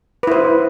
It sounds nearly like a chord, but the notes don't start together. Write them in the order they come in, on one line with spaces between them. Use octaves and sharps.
B4 E4 C5